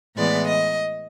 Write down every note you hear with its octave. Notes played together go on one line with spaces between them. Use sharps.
A2 E3 G#3 B3 D5
D#5